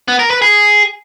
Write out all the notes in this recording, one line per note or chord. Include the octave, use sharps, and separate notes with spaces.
B3
A#4
B4
G#4